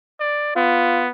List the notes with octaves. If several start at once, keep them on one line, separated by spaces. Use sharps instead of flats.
D5
B3 F4